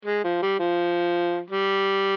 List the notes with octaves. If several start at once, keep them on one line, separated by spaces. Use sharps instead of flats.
G#3
F3
G3
F3
G3